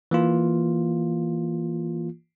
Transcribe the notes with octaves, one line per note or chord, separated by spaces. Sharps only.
E3 A#3 F4